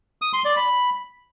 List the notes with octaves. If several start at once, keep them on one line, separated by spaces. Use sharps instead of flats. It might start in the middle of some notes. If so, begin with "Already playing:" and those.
D#6
C6
D5
B5